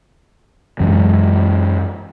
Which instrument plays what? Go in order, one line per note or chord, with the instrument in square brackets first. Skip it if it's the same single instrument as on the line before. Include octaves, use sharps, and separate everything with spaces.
[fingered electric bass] F#2 E3 G#3